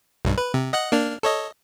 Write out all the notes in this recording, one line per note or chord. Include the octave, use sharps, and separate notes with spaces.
B1 G2
B4
C3
D#5 F#5 F#6
A#3 D4 F6
A4 C#5 D#5